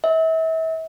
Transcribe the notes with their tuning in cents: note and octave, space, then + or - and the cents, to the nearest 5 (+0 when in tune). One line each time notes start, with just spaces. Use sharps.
E5 -35